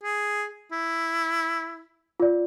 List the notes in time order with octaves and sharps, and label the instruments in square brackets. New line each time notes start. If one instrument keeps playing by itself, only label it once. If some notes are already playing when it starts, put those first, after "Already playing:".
[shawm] G#4
E4
[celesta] F4 D5